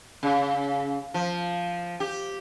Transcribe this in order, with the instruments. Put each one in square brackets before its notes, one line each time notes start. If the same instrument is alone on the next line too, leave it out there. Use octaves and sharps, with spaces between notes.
[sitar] C#3
F3
G4